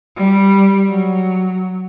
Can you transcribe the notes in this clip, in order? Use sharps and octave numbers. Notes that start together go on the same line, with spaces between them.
G3
F#3